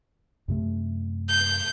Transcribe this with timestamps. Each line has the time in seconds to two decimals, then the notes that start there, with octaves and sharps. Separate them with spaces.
0.48 F#2 C3 A3
1.30 G6